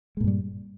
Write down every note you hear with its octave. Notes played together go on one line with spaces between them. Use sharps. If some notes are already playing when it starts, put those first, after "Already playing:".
G2 A#2 G3 G#3